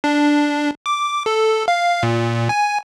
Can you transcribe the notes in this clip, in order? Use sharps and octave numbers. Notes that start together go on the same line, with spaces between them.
D4
D6
A4
F5
A#2
G#5